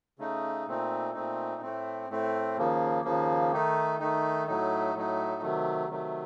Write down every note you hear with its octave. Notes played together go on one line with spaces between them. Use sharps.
C#3 A3 D#4
A#2 A3 C4 D#4
A#2 A3 C4 D#4
A2 A3 C4
A2 A3 C4
D#2 C#3 F3 A#3
D#2 C#3 F3 A#3
D#3 A3 D#4
D#3 A3 D#4
A2 F#3 A3 D#4
A2 F#3 A3 D#4
C3 D#3 F#3 A3
C3 D#3 F#3 A3